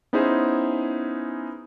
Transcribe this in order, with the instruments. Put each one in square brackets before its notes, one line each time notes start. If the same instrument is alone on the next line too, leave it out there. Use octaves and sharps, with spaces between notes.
[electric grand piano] B3 C#4 D#4 E4 G#4 C5